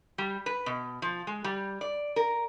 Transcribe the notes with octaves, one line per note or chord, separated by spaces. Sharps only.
G3
B4
B2
F3
G#3
G3
D5
A#4